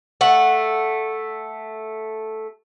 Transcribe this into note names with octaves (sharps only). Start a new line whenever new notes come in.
A3 F#5